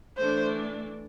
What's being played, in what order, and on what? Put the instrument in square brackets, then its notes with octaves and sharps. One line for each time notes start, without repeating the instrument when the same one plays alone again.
[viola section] E3 A3 D4 [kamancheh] C5